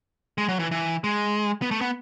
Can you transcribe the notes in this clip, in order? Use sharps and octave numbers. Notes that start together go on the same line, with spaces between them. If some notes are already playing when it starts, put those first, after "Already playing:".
G#3
F#3
E3
E3
G#3
B3
A3
B3